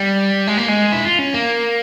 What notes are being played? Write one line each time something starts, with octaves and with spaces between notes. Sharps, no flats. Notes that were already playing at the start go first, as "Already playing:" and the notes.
Already playing: G3
G#3
A#3
G#3
E4
F4
C#4
A#3